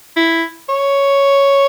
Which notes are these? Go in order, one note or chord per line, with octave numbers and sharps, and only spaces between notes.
E4
C#5